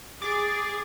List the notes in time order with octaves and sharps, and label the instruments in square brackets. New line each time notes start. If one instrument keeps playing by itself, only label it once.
[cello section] G#4 [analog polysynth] D6 A6